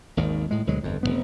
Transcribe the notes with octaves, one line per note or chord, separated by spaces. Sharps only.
G#1 D#2 D#3
A2 G#3
D2 B2 F#3 G#3
G1 F2
F1 G2 B3